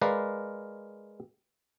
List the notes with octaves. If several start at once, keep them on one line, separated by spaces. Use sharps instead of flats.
G#3 A#4 B4 D5 F5